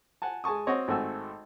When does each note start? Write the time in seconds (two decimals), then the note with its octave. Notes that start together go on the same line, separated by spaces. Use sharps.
0.22 F#5 G#5 A5
0.44 G#3 G#5 A5 C#6 D#6
0.67 C4 F#4 C#5 D#5
0.88 G#1 A3 C4 F#4 G#5 E6